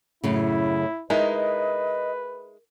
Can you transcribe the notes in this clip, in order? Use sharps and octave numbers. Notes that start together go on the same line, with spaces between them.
F#2 A2 C#3 E4
G#3 D#4 E4 A#4 B4 D#5